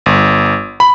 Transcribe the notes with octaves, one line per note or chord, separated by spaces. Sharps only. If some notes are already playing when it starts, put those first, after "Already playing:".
G1
B5